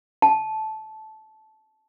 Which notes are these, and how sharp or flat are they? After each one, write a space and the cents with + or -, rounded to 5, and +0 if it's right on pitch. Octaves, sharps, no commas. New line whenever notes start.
A5 -15